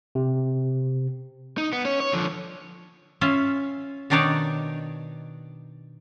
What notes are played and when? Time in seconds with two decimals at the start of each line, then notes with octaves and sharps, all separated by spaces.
0.15 C3
1.58 D#4
1.73 B3
1.85 C#4 C#5
2.00 C#5
2.13 D3 F3
3.21 C#4 F4 E5
4.10 B2 D#3 D4 D#4 C#5 D5